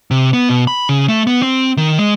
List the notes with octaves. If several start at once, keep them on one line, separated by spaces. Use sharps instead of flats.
C3
B3
B2
B5
C#3
A3
B3
C4
D#3
G#3